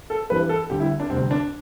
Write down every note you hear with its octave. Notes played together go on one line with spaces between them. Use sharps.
A4
G2 E3 G3 B4
A4
D2 D3 G3 G4
E4
D4
D2 C3 G3 C4
D4